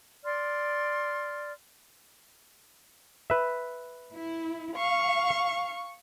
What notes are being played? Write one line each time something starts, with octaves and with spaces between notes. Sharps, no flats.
D5 C6 F6
B4 E5
E4
F5 C#6